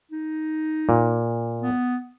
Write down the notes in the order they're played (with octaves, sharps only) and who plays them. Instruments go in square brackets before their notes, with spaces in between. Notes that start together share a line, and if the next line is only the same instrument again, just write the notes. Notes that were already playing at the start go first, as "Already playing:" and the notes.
[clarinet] D#4
[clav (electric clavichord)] A#2
[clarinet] B3